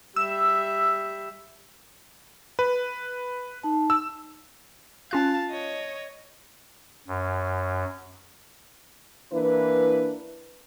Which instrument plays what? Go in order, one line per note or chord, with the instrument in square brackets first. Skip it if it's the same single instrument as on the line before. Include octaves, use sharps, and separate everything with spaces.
[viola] G3 E5 [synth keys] E6
[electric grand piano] B4
[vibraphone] D#4 A5
[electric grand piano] E6
[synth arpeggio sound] C#4 F4 F#6 [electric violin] F5 A5
[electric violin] C#5 D#5
[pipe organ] F#2
[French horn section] E3 A#3 D4 E4 B4